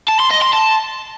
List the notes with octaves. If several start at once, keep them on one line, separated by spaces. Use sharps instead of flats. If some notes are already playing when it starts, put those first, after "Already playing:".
A5
C6
D#5
C6
A5